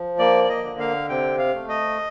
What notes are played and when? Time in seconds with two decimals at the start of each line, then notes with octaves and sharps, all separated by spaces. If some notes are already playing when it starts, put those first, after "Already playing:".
Already playing: F3
0.19 A#3 D5
0.44 D5
0.49 D#5
0.64 D3
0.80 F5
1.09 C3 G5
1.39 F5
1.54 A3
1.69 D#5